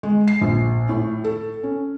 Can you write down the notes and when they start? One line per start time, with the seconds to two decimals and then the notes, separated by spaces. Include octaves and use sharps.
0.03 G#3
0.28 C7
0.41 A#1
0.89 A2
1.24 A4
1.63 C#4